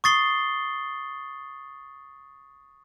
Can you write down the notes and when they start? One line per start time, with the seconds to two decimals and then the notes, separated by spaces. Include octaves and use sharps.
0.04 C#6 D#6 A6 C7 G7